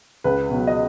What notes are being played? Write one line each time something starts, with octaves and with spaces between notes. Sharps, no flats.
C#2 B4
B2 F#3
D#5